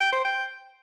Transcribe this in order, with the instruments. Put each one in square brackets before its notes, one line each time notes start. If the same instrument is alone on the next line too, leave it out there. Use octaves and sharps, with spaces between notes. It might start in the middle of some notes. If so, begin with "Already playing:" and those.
[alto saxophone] G5
C5
G5